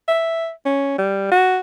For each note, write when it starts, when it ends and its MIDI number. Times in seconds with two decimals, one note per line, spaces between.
0.08 0.50 76
0.65 0.96 61
0.98 1.30 55
1.31 1.60 66